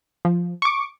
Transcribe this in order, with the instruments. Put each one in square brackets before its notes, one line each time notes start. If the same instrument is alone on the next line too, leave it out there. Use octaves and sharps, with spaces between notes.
[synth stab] F3
C#6 D6